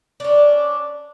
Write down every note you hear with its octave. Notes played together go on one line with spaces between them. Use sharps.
C#4 D4